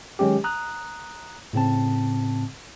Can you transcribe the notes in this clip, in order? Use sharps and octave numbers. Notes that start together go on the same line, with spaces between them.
D#3 F#3 G#3 C#4 G4
A#5 D#6 F#6
A2 C#3 C4 A5